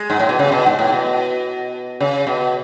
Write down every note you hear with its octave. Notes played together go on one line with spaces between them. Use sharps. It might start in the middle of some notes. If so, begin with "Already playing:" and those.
Already playing: G#3
G#2
A2
B2
C#3
B2
G#2
A2
B2
C#3
B2